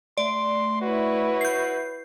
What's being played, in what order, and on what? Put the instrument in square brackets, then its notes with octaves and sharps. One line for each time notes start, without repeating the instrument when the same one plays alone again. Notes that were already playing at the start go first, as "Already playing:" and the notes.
[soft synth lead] A3 [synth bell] D5 [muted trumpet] C6
[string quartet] E4 B4 C#5 [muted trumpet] F#4
[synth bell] G6 C7